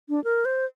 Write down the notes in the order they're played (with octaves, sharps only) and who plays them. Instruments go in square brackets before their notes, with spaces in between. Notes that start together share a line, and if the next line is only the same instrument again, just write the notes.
[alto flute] D4
A#4
C5